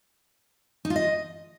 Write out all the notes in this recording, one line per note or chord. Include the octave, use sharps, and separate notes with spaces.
D#4
F4
D#5